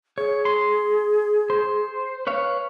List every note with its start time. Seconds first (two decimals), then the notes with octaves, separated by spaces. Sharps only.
0.18 G#4 C#5
0.45 C6
1.50 C5
2.27 B4 C#5 F5